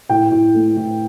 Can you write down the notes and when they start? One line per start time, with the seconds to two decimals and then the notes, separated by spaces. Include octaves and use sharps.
0.09 A2 G5
0.32 A2
0.55 A3
0.77 A2